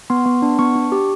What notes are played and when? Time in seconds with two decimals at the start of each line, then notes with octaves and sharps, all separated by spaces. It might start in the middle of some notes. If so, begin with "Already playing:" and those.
0.10 B3 C6
0.26 B3
0.42 D4
0.59 B3 C#6
0.76 D4
0.92 G4